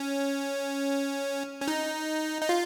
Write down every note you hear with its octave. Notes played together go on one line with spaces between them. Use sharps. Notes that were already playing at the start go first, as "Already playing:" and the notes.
Already playing: C#4
C#4
D#4
D#4
F4